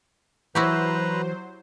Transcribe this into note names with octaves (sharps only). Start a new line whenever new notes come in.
E3 F#3 E4 F#4 G4 B4 C5 A#5